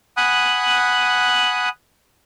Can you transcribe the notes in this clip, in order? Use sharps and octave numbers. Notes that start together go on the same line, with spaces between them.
F#5 G#5 B5 D#6 F#6